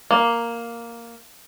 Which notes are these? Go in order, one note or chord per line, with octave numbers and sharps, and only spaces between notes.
A#3